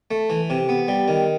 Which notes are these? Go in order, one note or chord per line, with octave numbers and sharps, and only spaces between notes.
A3
E3
C3
B3
G3
D#3